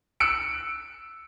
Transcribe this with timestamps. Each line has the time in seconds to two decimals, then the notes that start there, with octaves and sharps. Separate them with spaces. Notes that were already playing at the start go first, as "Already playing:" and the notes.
0.20 E6 F#6 C#7 D7